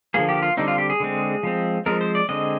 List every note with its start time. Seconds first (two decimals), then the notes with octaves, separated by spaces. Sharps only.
0.14 D3 F3 A#3 G#4
0.29 G4
0.43 F4
0.57 D3 G3 C4 D#4
0.68 F4
0.78 G4
0.90 G#4
1.00 D3 G#3 C4
1.43 F3 G#3 C4
1.86 F3 G#3 C4 A#4
2.01 C5
2.15 D5
2.29 D3 G#3 C4 D#5